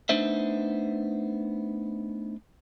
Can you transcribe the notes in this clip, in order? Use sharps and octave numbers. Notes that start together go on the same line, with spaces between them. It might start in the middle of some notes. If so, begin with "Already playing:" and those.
A3 B3 D4 D#4 C5 E5